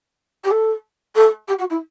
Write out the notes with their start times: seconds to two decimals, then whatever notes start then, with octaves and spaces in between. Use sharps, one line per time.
0.44 G4
0.51 A4
1.15 A4
1.48 G4
1.58 F#4
1.70 E4